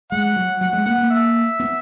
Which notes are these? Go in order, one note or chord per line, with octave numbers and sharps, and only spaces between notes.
G#3 F#5
F#3
F#3 F#5
G#3
A#3 F#5
A#3
E5
B3